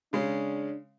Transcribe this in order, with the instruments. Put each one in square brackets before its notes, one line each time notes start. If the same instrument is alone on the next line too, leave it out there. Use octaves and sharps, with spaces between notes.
[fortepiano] C#3 G#3 C#4 [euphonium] D4